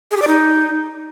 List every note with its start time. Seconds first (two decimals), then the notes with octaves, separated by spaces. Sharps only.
0.11 G#4
0.17 G4
0.22 D5
0.27 D#4